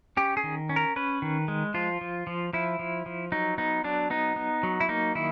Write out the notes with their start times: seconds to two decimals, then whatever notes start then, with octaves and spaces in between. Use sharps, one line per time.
0.17 C#4 G4
0.37 G#4
0.44 D#3
0.69 C#4
0.76 A#4
0.96 C#4 B4
1.22 D#3
1.48 G#3
1.74 F3 F4
2.01 F3
2.27 F3
2.53 F3 E4
2.79 F3
3.06 F3
3.32 F#3 D#4
3.58 B3 D#4
3.84 F#3 D4
4.10 B3 D#4
4.36 B3
4.63 F#3
4.80 E4
4.89 A#3 D#4
5.15 D#3 E4